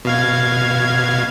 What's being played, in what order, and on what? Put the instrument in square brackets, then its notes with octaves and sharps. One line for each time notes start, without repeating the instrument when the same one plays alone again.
[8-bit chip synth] B2 F5 G#6